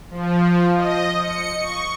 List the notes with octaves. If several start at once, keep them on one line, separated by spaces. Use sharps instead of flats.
F3
D#5
C#7
C#6